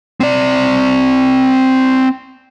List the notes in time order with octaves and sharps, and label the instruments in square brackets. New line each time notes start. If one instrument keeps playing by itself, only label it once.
[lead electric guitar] C4 D5